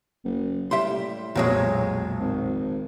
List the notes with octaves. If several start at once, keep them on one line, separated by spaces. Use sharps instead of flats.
F#1
A2 G3 E5 C6
B1 F2 A#2 F#3 G#3 D#6
G#1